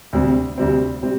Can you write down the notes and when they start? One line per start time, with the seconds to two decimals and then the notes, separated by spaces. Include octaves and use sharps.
0.13 D2 C3 G3 C4
0.58 D2 C3 G3 C4
1.02 C3 G3 C4